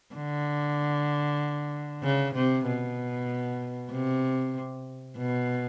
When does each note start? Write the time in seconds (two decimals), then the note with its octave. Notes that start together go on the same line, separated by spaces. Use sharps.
0.15 D3
2.03 C#3
2.35 C3
2.67 B2
3.92 C3
5.17 B2